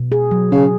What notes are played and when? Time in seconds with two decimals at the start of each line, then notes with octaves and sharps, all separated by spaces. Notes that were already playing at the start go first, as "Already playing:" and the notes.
Already playing: B2
0.12 G#4
0.31 F#3
0.51 C#3 G#4